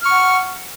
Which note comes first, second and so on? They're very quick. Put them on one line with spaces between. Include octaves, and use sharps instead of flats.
F6 C#6 F#5